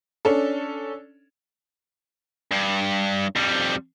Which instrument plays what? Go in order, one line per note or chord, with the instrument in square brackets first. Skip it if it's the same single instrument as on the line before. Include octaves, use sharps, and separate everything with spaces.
[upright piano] C#4 D4 A4
[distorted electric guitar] G2
F2 G3